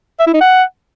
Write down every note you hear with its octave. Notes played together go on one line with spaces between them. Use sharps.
E5
E4
D#4
F#5